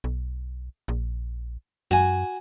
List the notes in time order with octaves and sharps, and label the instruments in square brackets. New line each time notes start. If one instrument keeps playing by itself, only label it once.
[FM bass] B1
A#1
[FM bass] F#2 [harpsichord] F#4 G#5